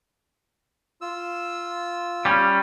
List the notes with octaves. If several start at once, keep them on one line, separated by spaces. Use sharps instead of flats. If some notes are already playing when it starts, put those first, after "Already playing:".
F4 E6
G3 C#4